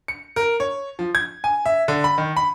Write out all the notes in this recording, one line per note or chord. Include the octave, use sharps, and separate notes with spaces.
C#7
A#4
C#5
F3
G#6
G#5
E5
D3
B5
D#3
B5